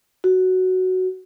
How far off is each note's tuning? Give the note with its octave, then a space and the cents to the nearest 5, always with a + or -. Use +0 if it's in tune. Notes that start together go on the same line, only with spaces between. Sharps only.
F#4 +5